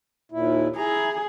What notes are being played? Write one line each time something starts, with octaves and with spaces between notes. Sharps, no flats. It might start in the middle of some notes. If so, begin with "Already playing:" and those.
D#2 A#2 E4
E4 G#4 A#5